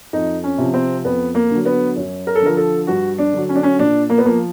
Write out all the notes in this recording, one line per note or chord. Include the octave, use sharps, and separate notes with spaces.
F2 D#4
C#4
C3 F3
C4
F2 B3
A#3
D3 F#3
B3
F#2
A#4
A4
D3 F3 A#4
A4
G2 F#4
D4
D3 F#3
C#4
D4
C#4
A#2 D4
A#3
B3
F3 A#3